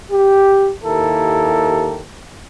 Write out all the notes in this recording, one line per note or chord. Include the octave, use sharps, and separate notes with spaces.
G4
D#2 E4 G4 A4 A#4